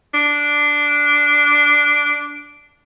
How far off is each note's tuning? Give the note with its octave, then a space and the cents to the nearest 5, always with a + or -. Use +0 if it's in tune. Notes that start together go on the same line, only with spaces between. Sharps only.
D4 -5